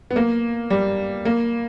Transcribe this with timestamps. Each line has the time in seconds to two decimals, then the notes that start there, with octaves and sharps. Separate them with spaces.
0.11 B3
0.16 A#3
0.70 G3
1.25 A#3